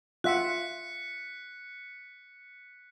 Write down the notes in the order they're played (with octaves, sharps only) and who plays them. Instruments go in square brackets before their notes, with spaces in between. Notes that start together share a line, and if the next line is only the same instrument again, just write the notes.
[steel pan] F4 E5 F#5 [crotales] F#6 B6 C#7